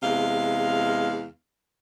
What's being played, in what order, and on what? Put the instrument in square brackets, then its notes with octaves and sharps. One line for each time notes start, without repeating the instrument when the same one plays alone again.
[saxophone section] E2 C3 G#3 F5